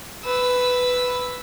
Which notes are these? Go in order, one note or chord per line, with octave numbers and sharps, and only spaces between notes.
B4 E6